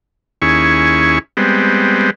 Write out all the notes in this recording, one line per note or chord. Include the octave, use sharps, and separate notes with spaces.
D#2 C#4 E4 G#4 C#6
G3 G#3 B3 C4